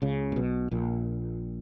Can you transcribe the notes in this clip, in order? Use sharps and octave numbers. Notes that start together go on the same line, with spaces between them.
C#2 C#3
A#2
B1 B2
A#1 A#2